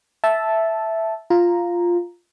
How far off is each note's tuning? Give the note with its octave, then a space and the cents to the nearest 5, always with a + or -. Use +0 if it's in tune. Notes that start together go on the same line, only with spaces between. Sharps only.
E5 +0 A5 -5
F4 +0 A#5 +0